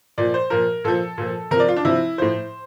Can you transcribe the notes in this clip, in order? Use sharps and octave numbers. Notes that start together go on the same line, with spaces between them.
A#2 F3 D5
C5
A#2 F3 A#4
A#2 F3 A4
A#2 F3
C3 F3 A#4 D5
F4
D4
C3 F3 E4
A2 F3 C5